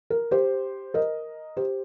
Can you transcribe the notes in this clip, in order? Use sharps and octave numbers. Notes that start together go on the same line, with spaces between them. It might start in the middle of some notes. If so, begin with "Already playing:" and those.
A#4
G4 C5
A#4 D#5
G4 C5